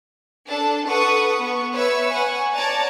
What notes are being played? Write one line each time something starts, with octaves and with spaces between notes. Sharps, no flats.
D4 A4 A5
A4 B4 F#5 C#6 D#6
B3 C#6
B4 C#5 E5 C#6 E6
F#5 G#5 C#6
C#5 D5 A5 A#5 A6